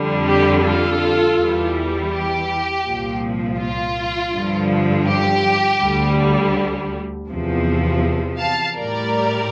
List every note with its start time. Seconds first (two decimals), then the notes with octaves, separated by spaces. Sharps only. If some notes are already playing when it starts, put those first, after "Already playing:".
Already playing: F2 D3 G3
0.26 G4
0.63 F4 A4
1.37 E2 E3 G3
2.12 G4
2.85 C2 A#2 F3
3.59 F4
4.33 G2 D3 F3
5.07 G4
5.81 D2 D3 G3
7.29 E2 C3 F3
8.39 F5 A5
8.76 A2 G3 A#4 D5